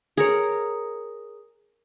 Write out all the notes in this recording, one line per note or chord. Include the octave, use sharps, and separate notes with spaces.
G#4 A#4 C#5